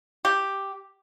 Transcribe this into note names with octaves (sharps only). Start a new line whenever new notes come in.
G4